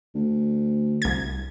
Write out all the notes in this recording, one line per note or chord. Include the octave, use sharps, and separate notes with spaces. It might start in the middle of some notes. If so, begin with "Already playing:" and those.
D2
C2 G#6